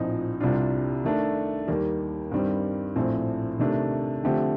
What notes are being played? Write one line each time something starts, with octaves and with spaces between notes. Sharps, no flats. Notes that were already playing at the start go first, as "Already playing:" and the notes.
Already playing: A#1 A2 F3 C4 D#4
C2 C3 G3 D4 F4
D#3 A3 D4
D#2 D#3 G3 A#3
G2 D#3 G3 C4
A#1 A2 A3 C4
C3 D#3 A3 D4
D3 F3 A3 C4 G4